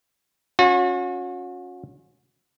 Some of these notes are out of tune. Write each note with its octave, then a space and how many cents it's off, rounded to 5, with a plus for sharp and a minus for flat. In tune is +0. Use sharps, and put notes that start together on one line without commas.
C#4 +0 F#4 -40